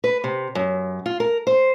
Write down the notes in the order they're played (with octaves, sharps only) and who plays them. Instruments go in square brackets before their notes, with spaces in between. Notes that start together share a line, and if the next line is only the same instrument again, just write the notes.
[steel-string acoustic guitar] B4
C3
F#2
F4
A#4
C5